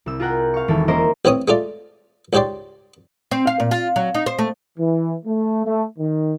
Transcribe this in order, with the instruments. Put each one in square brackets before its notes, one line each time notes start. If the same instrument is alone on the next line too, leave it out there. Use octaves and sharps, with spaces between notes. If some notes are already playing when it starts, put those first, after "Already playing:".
[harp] C2 E6
F4 G#4 A#4 F#5 G5
F5 C#6
E1 D#3 E4 A4
A#3 C#4 E4 A#4 C5 D#5
[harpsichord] A1 E3 C4 C#5 D#6
G#3 A3 F4 D5
C#2 G#2 G4 C#5 D5 C6
[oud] C4
F5
A#2
F4
F#3
D#4
C5
A3
[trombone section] E3
A3
A3
D#3